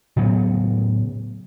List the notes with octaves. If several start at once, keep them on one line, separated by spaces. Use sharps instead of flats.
A2 C#3 F#3 B3